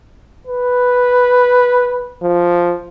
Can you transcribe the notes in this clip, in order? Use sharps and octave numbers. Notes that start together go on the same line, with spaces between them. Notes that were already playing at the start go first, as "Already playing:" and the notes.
B4
F3